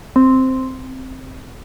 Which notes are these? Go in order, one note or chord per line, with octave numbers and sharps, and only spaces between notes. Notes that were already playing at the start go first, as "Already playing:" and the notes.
C4